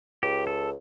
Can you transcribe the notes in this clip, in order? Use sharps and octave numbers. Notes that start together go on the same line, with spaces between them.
C#2 G4
A4